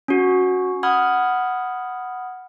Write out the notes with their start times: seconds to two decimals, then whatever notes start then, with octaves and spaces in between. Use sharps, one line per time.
0.08 C#4 F#4
0.83 F#5 B5 D#6 F6 G#6